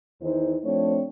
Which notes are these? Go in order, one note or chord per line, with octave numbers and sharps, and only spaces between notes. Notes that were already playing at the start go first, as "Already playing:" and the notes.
E2 D#3 D#4 E4 C5
F3 A3 C4 D4 C#5